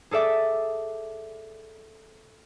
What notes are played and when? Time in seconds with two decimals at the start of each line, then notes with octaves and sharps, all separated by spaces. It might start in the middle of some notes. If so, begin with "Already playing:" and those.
0.11 G#4 A4 D5 E5 D6